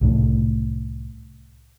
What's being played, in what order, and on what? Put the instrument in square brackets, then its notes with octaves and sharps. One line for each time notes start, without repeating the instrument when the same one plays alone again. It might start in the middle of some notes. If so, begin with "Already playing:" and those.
[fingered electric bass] C2 A2 A3